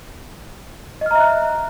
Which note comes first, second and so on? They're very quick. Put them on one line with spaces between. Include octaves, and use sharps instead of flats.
D#5 F6 A#5 E5 F#6